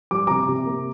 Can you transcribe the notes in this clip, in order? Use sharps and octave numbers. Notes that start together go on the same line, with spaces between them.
G3 D6
C3 A#5 D6
C3
A#3